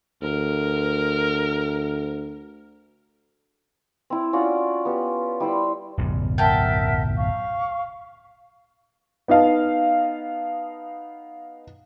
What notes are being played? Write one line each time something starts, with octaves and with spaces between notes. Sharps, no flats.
D2 A#4
C4 E4
C#4 F4 F#4 D5
B3 G4
G3 E4 C5 B5
D1 B1 F#2
A#4 E5 F#5 G5 A5
F5 C#6
B3 D#4 D#5 F5 A5